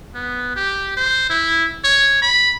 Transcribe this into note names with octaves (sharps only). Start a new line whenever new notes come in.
B3
G4
C5
E4
C#5
B5